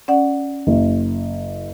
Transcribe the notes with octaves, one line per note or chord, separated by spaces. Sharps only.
C#4 D5 F#5
F#1